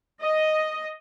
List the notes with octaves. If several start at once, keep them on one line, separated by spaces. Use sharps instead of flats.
D#5